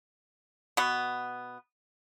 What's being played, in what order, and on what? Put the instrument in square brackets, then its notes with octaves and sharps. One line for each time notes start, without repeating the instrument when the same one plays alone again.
[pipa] B2 B3